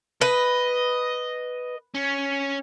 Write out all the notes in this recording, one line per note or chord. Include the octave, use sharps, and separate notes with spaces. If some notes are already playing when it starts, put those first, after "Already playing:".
B4 D#5
C#4